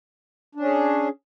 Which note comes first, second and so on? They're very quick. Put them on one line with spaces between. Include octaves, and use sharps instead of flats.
D4 C#4 G#4